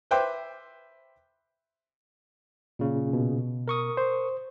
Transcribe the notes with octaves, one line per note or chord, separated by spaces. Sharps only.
B4 C5 E5 G5 D6 E6
A#2 C#3
B2
A#4 C#6 D#6
C5